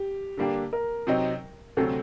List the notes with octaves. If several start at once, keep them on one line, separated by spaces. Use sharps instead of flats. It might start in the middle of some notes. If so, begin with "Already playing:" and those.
Already playing: G4
D3 G3 A#3 D4 G4
A#4
C3 F#3 C4 D#4
D2 C3 F#3 C4 A4